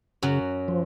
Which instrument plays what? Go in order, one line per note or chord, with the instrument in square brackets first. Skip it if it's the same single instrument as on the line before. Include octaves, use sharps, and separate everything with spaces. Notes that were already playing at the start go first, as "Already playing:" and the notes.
[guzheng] F#2 F#3 [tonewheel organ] C#3
[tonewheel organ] F3